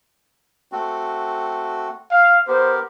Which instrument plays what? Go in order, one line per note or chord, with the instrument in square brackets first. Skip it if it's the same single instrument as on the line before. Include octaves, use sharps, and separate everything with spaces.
[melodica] A3 C4 F#4
[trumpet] F5
[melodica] B3 G4 A#4 [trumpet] C5